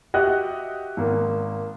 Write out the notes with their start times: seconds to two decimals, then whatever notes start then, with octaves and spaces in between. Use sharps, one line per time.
0.14 F#4 G4 D#5 E5 F#5 F#6
0.97 G#1 A#3